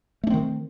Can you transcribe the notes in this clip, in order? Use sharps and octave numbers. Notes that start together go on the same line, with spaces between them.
D#3 A3 C4 D4